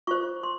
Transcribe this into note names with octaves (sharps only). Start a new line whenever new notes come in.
F4 C5 C#6
C6